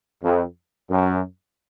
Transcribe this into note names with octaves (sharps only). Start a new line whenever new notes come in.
F2
F#2